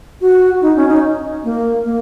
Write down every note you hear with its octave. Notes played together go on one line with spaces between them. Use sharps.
F#4
D#4
C#4
D#4
A#3
A#3